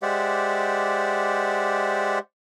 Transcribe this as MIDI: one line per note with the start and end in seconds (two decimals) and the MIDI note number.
0.02 2.19 56
0.02 2.19 67
0.02 2.19 72
0.02 2.19 74
0.02 2.19 76
0.02 2.19 78